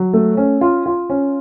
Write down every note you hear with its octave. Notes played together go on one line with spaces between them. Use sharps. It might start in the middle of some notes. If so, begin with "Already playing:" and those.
Already playing: F#3
A3
C#4
F4
F4
C#4